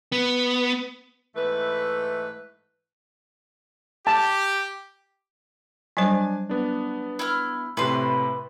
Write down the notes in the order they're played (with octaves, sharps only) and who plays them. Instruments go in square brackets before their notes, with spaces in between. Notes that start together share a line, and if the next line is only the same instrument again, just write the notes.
[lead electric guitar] B3
[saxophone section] G#2 E3 A3 B4
[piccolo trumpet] G4 [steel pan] A5
[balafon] F#3 G3 C5 [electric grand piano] D4 G#5
[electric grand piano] B3 D4
[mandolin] E4 F6
[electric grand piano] A2 C3 [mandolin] B4 C6